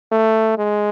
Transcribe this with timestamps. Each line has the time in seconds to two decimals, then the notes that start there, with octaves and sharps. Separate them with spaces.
0.11 A3
0.58 G#3